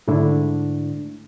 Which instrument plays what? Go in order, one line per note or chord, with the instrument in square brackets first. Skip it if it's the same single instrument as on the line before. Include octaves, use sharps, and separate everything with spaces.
[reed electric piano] G#2 D3 A3 D4 E4